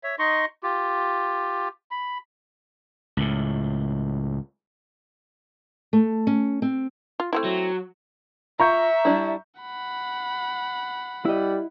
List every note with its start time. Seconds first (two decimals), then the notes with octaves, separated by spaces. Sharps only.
0.03 C#5 E5
0.19 D#4 D#5 C6 C#6
0.63 F4 G4
1.91 B5
3.17 C#2 A2
5.93 A3
6.27 C#4
6.62 C4
7.20 F4
7.33 A3 C4 E4
7.44 F#3
8.60 F4 E5 A#5 C#6 G6
9.05 G3 D4 E4
9.61 F#5 B5
11.25 G3 E4 D#5